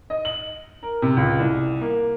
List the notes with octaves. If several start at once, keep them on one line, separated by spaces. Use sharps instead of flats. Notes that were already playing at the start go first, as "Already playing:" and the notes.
D#5
F#7
A#4
C3
C#2
C2
A#3